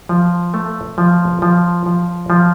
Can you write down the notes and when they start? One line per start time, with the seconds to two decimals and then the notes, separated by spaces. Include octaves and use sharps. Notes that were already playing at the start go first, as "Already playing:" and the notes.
0.09 F3
0.54 A3
0.98 F3
1.42 F3
1.86 F3
2.30 F3